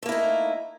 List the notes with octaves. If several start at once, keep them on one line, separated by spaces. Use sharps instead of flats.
A3 A#3 D#4 E4